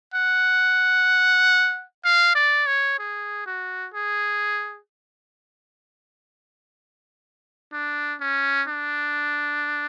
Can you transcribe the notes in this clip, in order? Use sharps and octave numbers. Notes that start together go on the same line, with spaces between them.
F#5
F5
D5
C#5
G#4
F#4
G#4
D4
C#4
D4